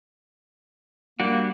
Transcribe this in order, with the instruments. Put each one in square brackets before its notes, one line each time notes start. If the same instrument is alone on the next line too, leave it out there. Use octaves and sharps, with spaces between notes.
[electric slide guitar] G3 D4 F#4 [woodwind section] A#3